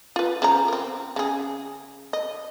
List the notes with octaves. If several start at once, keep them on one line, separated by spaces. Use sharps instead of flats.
F4 B4
C#3 F3 A#5
C4 A#4
C#3 G#4
D#5